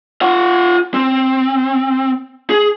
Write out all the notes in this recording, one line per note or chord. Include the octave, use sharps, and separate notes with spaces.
F4 F#5
C4
G#4